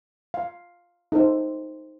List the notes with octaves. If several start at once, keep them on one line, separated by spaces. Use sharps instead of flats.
F5
D#4 A4 C5